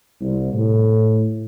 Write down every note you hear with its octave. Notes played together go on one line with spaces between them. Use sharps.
C2
A2